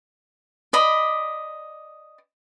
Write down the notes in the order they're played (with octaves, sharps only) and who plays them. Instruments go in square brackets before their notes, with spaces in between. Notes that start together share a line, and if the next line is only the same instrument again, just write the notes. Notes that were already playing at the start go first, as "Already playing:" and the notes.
[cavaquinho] D5 D#5 B5